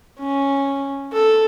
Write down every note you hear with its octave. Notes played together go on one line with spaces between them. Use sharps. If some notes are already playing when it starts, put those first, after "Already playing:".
C#4
A4